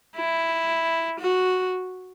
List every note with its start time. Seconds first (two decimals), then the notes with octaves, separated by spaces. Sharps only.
0.17 E4
1.19 F#4